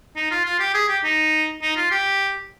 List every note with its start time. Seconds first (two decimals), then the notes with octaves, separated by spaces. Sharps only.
0.16 D#4
0.31 F4
0.45 F4
0.60 G4
0.74 G#4
0.88 G4
1.04 D#4
1.62 D#4
1.77 F4
1.91 G4